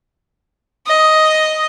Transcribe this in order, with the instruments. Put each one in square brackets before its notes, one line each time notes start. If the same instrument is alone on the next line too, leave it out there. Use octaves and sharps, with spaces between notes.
[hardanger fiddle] D#5